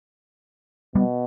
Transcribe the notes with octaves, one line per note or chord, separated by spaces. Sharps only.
B2 G3 B3